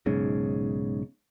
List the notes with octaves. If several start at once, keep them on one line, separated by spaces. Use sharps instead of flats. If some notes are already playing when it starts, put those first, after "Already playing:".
B1 G#2 C#3